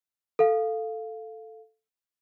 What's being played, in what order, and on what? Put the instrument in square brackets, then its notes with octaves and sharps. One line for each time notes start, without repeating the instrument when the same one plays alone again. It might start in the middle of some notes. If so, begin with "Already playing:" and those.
[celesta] A4 F5